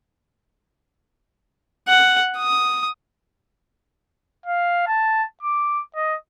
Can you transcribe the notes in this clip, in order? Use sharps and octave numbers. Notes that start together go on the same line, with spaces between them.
F#5
D#6
F5
A5
D6
D#5